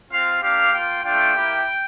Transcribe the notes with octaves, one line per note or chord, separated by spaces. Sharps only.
C4 F4 F5
A#3 D4 G4 F5
A#3 F4 G5
A3 D4 F4 G5
A#3 E4 G4